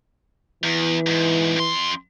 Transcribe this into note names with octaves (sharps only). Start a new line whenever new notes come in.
E2 E3
E2 G#2
F2 C6